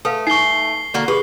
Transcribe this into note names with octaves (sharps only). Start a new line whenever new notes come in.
A3 A4 B4 F5
D#4 C#6 C7 G7
D3 A#3 F#4
G4 G#4 B4